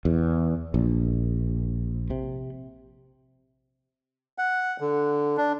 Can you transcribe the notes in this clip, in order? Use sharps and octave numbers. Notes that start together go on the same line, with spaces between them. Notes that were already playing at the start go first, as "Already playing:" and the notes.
E2
A#1
C3
F#5
D3
D4